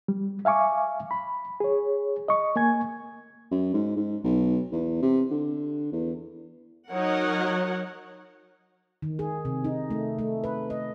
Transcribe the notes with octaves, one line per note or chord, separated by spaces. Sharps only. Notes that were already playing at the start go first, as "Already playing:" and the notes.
G3
E5 F5 G#5 C#6 D6
B5
G#4 C#5
D#5 C#6
A#3 G#5 G#6
F#2
G#2
G#2
B1
E2
C3
D3
E2
F#3 D#4 A#4 C#5 F#5
D#3
G#4
C3
D#4
A3
A3
B4
D#5